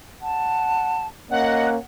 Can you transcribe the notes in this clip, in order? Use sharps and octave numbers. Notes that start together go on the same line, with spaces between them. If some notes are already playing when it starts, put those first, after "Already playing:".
F#5 A5
A#3 C#4 D#5 F#5